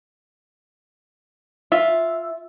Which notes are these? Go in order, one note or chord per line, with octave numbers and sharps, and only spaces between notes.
F4 E5